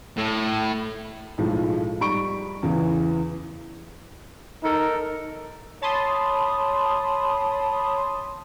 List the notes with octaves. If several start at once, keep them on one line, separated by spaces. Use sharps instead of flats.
A2
B1 A2 F3 G#3
G#2 G3 B5 C#6 D7
E2 C#3 E3
D#4 A4 A#4
C#5 A5 B5 C6 D#6